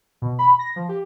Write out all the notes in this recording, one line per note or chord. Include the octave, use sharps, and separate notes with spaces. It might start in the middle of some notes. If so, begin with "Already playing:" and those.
B2
B5
A#6
F3
G4